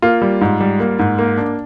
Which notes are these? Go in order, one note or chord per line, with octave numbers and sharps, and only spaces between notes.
A#3 F4
G3
G#2
G3
A#3
G#2
A#3
D4